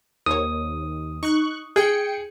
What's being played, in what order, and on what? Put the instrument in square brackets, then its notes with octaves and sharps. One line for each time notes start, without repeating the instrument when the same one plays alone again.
[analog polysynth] D#2 [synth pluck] A#4 C5 C#5 [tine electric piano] D#6
[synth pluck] D#4 [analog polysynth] C#6 F#6
[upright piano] G#4 [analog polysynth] G5 C#7